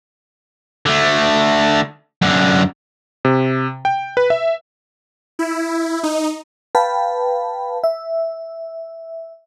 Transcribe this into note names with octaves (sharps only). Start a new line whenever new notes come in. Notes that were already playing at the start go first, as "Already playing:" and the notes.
D3 A3
F#2 D3
C3
G5
B4
E5
E4
D#4
B4 F5 G5 A5 B5
E5